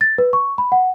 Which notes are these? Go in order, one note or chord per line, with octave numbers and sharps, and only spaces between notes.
A6
B4
C#6
B5
F#5